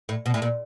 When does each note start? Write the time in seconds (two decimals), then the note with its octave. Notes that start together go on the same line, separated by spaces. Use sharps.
0.09 A2
0.26 B2
0.34 A2
0.42 A#2